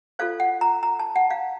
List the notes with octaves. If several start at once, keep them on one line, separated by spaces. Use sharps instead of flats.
F4 A4 C5 F5
F#5
A#5
A#5
A5
F#5
F5